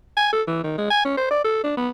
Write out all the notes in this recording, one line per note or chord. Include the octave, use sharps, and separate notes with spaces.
G#5
A4
E3
D#3
G#3
G#5
C#4
C5
D5
A4
D4
B3